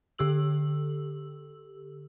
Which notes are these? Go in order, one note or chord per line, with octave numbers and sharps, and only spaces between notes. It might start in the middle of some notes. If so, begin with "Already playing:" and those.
D3 G4 A4 E6 F#7